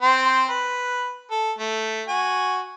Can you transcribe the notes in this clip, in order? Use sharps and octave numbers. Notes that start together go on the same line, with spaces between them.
C4 C5 C6
B4
A4
A3
F#4 G#5